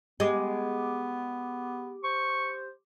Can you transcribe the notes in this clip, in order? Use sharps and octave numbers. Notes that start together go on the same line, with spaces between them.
G#3 B3 G4 D6
C5 C#6